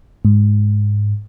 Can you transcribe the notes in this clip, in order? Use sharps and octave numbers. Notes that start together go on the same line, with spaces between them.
G#2